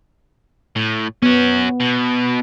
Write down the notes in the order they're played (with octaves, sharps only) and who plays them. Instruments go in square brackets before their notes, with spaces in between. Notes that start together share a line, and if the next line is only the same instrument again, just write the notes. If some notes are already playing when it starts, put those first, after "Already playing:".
[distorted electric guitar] A2
[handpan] B3 [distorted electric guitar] C#4 F#4
[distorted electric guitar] B2